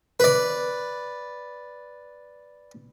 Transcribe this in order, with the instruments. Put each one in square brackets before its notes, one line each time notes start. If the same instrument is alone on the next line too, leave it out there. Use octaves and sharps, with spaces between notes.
[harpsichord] B4 D5